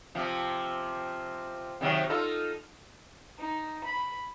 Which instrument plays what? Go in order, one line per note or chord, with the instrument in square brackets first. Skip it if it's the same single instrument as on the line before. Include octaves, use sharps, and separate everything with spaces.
[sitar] C3 F3
C3 D#3 F#3
D#4 F4 A4
[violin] D#4
B5